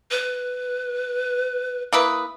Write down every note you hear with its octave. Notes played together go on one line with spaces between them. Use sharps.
B4
A#3 E4 B4 D#6